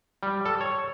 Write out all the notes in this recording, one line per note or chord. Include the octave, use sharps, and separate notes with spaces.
G3
A4
C#5